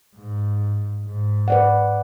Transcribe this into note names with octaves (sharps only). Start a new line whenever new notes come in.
G#2
G#2
B4 D5 F#5